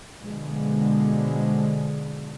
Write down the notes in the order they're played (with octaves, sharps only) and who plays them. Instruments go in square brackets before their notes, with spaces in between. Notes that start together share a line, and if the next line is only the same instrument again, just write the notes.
[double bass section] B2 D3 F3 G#3